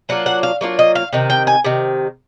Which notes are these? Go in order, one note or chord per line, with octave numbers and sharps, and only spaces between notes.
F#3 A#3 D4 F4 F#5
F#5
F5
F#3 A#3 D4 F4
D#5
F5
C3 D#3
G5
G#5
C3 D#3